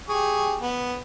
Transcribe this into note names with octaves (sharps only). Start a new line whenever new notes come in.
G4 G#4 C#6
B3